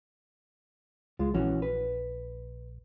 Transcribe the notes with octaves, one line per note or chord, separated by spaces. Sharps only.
C#2 G#3 F4
A#1 E3 C#4 F#4
B4